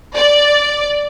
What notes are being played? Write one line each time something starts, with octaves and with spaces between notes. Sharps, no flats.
D5